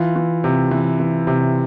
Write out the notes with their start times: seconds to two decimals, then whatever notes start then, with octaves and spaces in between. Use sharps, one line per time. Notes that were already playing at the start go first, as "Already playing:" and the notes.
Already playing: E3 F4
0.16 E3
0.44 C3
0.71 E3
1.00 E3
1.27 C3